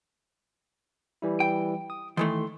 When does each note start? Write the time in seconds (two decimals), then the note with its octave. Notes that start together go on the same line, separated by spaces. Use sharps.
1.22 E3 G3 E4
1.40 G5
1.90 D#6
2.17 D#3 E3 A3 C6